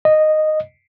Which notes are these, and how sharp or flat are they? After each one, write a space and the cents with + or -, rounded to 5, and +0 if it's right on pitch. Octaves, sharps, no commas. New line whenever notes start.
D#5 -10